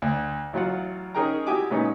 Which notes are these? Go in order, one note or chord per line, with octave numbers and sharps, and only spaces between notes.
D2
A1 F#3 F4 F#5
C#4 D#4 G#4 A#4 G5 A#5
E4 F#4 G4 G#5 D6 D#6
A#2 G#3 B3 C#4 D#4